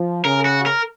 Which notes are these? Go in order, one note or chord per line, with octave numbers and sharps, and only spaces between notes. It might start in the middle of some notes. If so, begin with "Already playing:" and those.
Already playing: F3
C#3 A#4
F#4
A#4